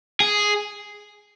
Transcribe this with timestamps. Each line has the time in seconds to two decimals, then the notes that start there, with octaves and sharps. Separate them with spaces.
0.20 G#4